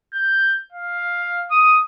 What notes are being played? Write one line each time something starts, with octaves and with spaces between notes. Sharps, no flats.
G6
F5
D#6